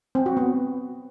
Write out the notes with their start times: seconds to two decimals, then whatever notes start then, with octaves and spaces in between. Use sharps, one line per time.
0.15 C4
0.26 F#4
0.37 B3